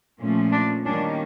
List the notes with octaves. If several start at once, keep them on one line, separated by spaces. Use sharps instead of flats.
A#2 F3 A3 C#4
D4
D#3 G3 A#3 C#4 D4